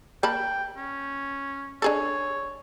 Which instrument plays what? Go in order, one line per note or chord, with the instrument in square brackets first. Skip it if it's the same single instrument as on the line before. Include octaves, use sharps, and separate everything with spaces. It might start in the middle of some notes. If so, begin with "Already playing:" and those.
[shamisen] A#3 A5 B5 [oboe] G5
[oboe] C#4
[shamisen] D4 G#4 A4 [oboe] C#5